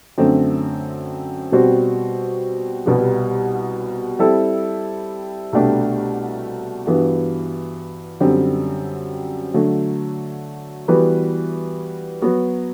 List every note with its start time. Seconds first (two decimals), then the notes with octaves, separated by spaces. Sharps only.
0.18 F#2 D3 A3 C4
1.52 B2 G3 C4 F#4 C5
2.86 C2 B2 G3 B3
4.19 G3 C4 E4 A4
5.53 C2 B2 A3 D4 G4
6.87 G2 E3 B3 F#4
8.20 F#2 D3 G3 C4
9.54 D3 F#3 A3
10.88 E3 G3 B3 F#4 B4
12.22 F#3 B3 F#4